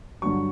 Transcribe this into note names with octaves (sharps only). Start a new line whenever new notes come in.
G2 D3 F#3 C#6